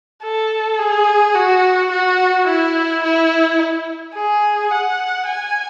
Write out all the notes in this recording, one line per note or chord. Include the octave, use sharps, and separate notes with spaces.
A4
G#4
F#4
F#4
E4
E4
G#4
F#5
G#5